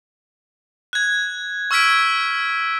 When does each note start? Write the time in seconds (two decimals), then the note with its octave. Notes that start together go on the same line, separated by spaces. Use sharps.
0.93 F#6 G#6
1.71 C#6 E6 F6 G#6 B6 D7